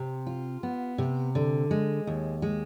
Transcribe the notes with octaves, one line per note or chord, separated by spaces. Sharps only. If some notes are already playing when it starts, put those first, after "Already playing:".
Already playing: C3
F4
B3
C3
D3
G#3
D#2
G#3